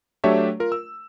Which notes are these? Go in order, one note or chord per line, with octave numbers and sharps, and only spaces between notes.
F#3 A3 D4 G4 C#5 E5
F4 A#4
E6